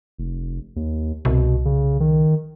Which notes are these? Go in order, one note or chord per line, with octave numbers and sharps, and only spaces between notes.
F1
D#2
C2 B2
C#3
D#3